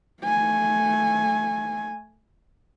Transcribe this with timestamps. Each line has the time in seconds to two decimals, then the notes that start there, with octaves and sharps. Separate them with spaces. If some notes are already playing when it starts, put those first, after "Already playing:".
0.23 A3 G#5